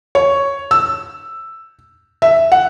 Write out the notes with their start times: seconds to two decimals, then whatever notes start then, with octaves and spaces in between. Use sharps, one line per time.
0.15 C#5
0.71 E6
2.22 E5
2.52 F#5